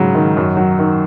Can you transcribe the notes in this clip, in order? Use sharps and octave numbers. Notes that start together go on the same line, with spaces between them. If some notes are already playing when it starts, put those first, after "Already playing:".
Already playing: G#2 C#3 F#3
D#3
F#2
F#3
D#3